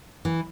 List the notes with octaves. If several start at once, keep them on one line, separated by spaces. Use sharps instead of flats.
E3